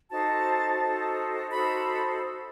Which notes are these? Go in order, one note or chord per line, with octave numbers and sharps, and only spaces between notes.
D#4 F#4 A4 C5 A5
D#4 F#4 A4 C5
D#4 F#4 A4 C5 B5